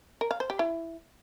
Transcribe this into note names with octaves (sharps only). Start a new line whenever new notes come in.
A#4
F5
C5
G4
E4